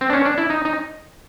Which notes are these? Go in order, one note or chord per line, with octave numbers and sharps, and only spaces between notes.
C4
D4
C#4
D4
E4
D#4
D#4